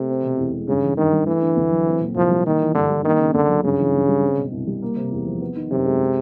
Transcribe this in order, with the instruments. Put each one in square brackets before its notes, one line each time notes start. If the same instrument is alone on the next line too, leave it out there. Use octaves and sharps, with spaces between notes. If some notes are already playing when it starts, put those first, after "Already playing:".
Already playing: [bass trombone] C3 [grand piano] A3
[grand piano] C4
B2
E2
G#3
[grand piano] G2 [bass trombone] C#3
[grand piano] E3
[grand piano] G2 [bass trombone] D#3
[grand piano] G3
[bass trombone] E3 [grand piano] A3
[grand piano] D3
D2
F#3
C4
A#2
[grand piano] C2 [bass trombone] F3
[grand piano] G3
[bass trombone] D#3 [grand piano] A#3
[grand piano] E3
[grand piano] G2 [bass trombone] D3
[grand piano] G3
[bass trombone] D#3 [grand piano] A#3
[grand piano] C#3
[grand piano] D2 [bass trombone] D3
[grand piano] F#3
[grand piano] G2 [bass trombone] C#3
[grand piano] E3
G2
G3
C4
B2
C2
G3
A#3
C3
E2
F3
B3
D#3
[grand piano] F#2 [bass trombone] C3
[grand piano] G#3
G#3